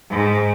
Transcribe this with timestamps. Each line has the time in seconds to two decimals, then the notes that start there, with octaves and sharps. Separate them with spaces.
0.11 G#2